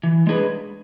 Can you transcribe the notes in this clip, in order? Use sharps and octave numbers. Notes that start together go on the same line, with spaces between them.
E3
G#3 D4 G#4 B4